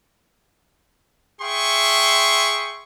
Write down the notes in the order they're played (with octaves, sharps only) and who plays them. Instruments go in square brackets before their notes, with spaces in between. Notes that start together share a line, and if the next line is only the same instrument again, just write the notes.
[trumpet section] G#4 E5 G5 C6 C#6